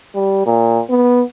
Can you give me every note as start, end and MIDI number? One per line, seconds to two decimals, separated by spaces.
0.15 0.43 55
0.46 0.80 46
0.90 1.22 59